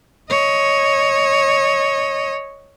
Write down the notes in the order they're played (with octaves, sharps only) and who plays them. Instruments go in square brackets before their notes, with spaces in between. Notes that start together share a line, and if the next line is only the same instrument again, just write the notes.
[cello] C#5 D#5